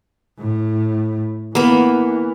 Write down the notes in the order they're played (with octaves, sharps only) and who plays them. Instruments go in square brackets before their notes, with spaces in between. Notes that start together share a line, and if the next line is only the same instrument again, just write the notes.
[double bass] A2
[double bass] E3 [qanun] A#3 B3